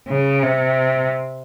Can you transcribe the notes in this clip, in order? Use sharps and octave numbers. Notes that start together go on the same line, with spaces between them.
C#3
C3